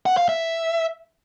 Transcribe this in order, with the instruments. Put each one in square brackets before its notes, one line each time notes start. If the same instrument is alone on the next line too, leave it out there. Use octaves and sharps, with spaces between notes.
[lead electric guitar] F#5
F5
E5